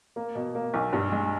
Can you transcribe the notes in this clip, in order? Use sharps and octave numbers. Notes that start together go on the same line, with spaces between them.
A#3
B2
A#3
B1
G2
G#3